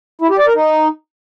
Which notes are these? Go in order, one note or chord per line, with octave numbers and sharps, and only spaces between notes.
E4
G4
D5
A#4
D#4